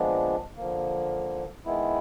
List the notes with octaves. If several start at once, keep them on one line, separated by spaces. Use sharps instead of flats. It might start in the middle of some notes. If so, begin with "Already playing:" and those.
Already playing: A#2 F3 G#3 B3 D4
D3 F3 A#3
D#3 G#3 B3 E4